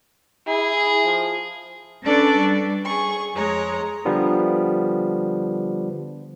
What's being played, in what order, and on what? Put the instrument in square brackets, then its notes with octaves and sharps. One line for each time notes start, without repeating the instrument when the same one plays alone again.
[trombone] E4 [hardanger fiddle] G#4
[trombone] F3
[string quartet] C#4 D4 A4 B4 D5 C#6
G3
G#4 C#6
F2 G#3 C#5 A#5
[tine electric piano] D3 F3 G3 B3